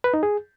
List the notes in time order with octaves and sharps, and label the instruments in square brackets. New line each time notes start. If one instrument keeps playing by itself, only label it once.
[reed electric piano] B4
D#4
G#4